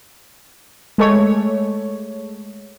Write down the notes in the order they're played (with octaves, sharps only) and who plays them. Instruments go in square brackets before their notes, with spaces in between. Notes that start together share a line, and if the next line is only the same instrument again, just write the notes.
[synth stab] G#3 A3 C#5